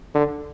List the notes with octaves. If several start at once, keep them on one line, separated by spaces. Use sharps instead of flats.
D3